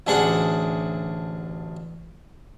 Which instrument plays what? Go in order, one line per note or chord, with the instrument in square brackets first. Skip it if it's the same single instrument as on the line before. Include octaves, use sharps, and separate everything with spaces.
[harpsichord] A1 D2 D4 G#4 F#5